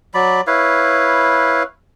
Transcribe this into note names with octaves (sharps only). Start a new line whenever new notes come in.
F#3 D5 B5
E4 B4 C#5 F5